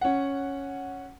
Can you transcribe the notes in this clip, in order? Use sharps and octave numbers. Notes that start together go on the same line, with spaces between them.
C#4 F#5